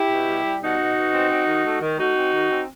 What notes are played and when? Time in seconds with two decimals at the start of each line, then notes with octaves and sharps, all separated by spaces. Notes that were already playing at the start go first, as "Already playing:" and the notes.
Already playing: E4 G4
0.10 B2
0.27 G3
0.44 G3
0.62 B2 D#4 F#4
0.79 B2
0.96 B2
1.13 C4
1.31 C4
1.47 D#3
1.65 A3
1.81 D#3
1.99 A3 D#4 F#4
2.16 C4
2.33 D#3
2.50 C4